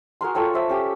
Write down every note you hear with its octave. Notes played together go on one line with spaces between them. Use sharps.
F#4 G#4 A#4 C6
F4 A4 C#5 G5
C5 D5 E5
C#4 G4